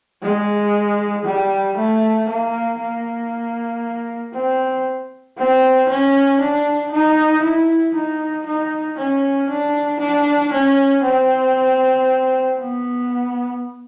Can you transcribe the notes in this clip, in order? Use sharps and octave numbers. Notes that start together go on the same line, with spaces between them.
G#3
G3
A3
A#3
A#3
C4
C4
C#4
D4
D#4
E4
D#4
D#4
C#4
D4
D4
C#4
C4
B3